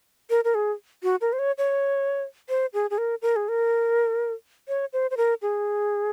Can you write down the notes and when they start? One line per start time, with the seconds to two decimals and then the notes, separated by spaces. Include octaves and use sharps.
0.30 A#4
0.44 A#4
0.55 G#4
1.03 F#4
1.21 A#4
1.33 C5
1.39 C#5
1.58 C#5
2.49 C5
2.74 G#4
2.90 G#4
2.98 A#4
3.22 A#4
3.36 G#4
3.49 A#4
4.68 C#5
4.93 C5
5.11 C5
5.17 A#4
5.42 G#4